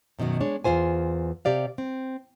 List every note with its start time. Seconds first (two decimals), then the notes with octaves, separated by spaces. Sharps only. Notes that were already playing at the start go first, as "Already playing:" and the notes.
0.19 F#2 B2 D#3 E3 F#3
0.41 G#3 D4 C#5
0.64 E2 G#2 F4 C5 G#5
1.45 C3 G4 D5 F5
1.78 C4